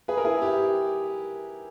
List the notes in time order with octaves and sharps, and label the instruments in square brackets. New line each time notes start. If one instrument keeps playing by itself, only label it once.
[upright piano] G#4 B4
A#4
E4 G#4
G4